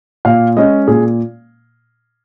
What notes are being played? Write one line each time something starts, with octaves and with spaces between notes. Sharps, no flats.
A#2 F5
G#3 C#4 D#5
A#2 G#4